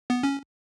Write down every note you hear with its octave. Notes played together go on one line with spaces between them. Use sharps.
B3
C#4